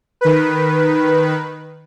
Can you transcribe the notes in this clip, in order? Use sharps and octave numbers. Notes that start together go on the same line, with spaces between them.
D#3 B4